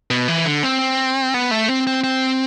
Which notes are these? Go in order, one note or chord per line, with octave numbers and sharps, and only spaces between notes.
B2
E3
D3
C4
B3
A3
C4
C4
C4